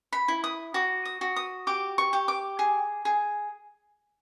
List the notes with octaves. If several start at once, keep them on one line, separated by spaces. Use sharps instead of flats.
B5
E4
D#6
F#4 D6
D#6
F#4
D#6
G4 D6
C#6
G4
D6
G#4
G#4